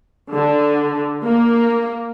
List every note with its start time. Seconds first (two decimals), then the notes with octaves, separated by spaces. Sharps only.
0.33 D3
1.26 A#3